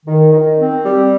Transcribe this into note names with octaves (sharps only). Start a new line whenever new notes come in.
D#3
D#3
C4
G3